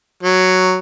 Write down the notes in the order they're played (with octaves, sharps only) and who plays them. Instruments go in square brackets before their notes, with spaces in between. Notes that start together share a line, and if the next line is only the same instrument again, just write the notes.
[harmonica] F#3